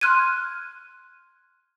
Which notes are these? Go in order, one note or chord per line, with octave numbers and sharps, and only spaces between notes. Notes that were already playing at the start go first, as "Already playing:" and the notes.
C6 F6 F#6 G#6 D#7